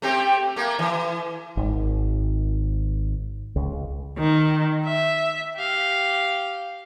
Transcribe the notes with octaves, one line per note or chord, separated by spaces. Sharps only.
A3 C4 G4
A3 A#3
E3
G#1
C#2
D#3
E5
G4 F5